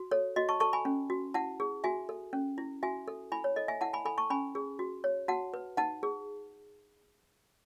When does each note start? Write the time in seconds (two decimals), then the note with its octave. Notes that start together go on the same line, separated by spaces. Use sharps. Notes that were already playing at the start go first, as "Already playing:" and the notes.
Already playing: F#4
0.11 A4 C#5
0.36 F#4 D#5
0.49 A5 C#6
0.60 A4 A5 C#6
0.73 G#5 B5
0.85 C#4
1.10 F#4
1.34 E4 F#5 A5
1.60 G#4
1.84 F#4 E5 G#5
2.09 A4
2.33 C#4
2.58 E4
2.83 F#4 E5 G#5
3.08 A4
3.32 E4 G#5 B5
3.44 C#5
3.56 A4 D#5
3.68 E5 G#5
3.81 E4 F#5 A5
3.93 G#5 B5
4.05 A4 G#5 B5
4.18 A5 C#6
4.30 C#4 G#5 B5
4.55 G#4
4.79 F#4
5.04 C#5
5.28 F#4 F#5 A5
5.54 B4
5.77 D#4 F#5 A5
6.03 G#4